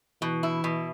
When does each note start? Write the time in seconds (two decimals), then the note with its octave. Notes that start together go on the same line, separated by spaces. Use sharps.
0.22 B2 E3
0.43 E4
0.64 B2